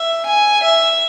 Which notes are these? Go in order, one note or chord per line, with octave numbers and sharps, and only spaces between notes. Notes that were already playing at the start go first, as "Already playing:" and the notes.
Already playing: E5
G#5
E5